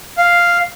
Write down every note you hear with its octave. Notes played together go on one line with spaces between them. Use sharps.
F5